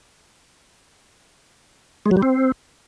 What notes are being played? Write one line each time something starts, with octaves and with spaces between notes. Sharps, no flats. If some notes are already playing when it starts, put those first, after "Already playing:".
G#3
F#3
G3
C4